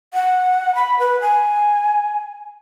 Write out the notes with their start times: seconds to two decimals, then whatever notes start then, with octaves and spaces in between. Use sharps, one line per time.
0.14 F#5
0.75 B5
0.99 B4
1.21 G#5